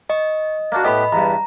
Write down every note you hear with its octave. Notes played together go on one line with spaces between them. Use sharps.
D#5 C#6
A#3 D4 F#4
A2 B3 G4 D#5 B5
E2 G2 A#5